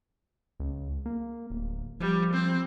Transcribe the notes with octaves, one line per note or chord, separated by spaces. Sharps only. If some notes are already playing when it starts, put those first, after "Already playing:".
C#2
A#3
D1
F3 G3
C4